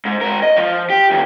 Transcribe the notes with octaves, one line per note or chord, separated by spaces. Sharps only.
G#2
G#2 A#4
D#5
F3
G4
F2 D#3